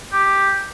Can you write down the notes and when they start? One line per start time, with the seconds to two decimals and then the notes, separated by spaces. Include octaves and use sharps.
0.12 G4